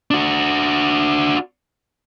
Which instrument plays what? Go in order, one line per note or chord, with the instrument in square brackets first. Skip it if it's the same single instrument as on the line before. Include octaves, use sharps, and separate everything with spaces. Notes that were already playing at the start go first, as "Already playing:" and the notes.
[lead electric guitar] D4 F#4